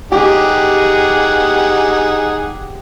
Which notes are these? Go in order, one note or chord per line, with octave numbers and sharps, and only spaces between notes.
D#4 G4 G#4 F#5